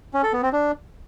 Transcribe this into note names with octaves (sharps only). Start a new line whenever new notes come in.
C#4
A4
B3
C4
D4